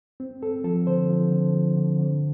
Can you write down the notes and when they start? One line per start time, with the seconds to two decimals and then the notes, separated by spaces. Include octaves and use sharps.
0.20 C4
0.42 C4 A4
0.64 F3 A4
0.87 D3 C5
1.09 F3
1.31 D3
1.54 F3
1.77 D3
1.98 D3